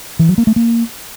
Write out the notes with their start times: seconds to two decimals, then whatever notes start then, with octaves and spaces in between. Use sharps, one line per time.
0.19 E3
0.29 F#3
0.38 A#3
0.47 A3
0.56 A#3